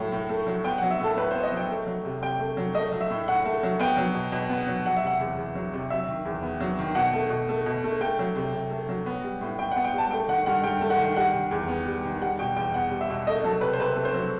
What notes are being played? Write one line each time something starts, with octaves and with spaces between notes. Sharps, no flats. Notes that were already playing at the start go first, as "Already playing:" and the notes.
Already playing: A2 F#3 A3
A2
A3
F#3
B3 G5
F#5
F#3
E5
A2 A4
A2 B4
C5
B3
D#5
F#3
G5
A3
F#3
C3
C3 G5
A3
F#3
A3 D#5
F#3
E5
A2
A2 F#5
A3
F#3
B3 G5
F#3
B2
B2
B3
F#3
F#3 F#5
E5
C3 F#5
E2
E2
F#3
C3
F#3 E5
D#3
E2
B3
F#3
D#3
B2 F#5
A3
B2
A3
B2
A3
A3 G5
F#3
C3
C3
A3
F#3
B3
G3
A2
A2 G5
F#5
B3
G5
G3
A5
A3 G5
D#3 F#5
G2 F#5
G2 G5
A3
F#5
D#3
G3 F#5
D#3
E2
B3
G3
D#3
G3 F#5
B2 G5
E2 G5
B3 F#5
G3
E5
B2
A3 D#5
F#3 A4
C3 B4
C5
C3 B4
A3
C5
F#3